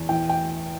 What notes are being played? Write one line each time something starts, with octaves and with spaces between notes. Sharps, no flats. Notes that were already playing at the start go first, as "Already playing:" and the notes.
Already playing: E2
E3 G5
G5